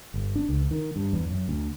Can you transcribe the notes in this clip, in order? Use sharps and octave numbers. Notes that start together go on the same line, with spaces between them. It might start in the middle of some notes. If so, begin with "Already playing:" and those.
G1
D4
C#2
D#3
G2
E2
F#2
D2